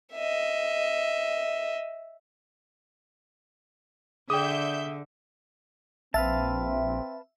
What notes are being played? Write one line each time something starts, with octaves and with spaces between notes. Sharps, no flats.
D#5 E5
D3 G#4 D5 E5 G5 D#6 G6
A#1 C4 B4 E5 F5 A5